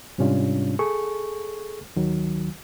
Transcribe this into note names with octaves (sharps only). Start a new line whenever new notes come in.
G#2 C3 G3 C#4 D4 F4
G#4 A4 C#6
D2 D#3 F#3